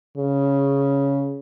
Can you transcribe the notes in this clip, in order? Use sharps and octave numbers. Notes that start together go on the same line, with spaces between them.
C#3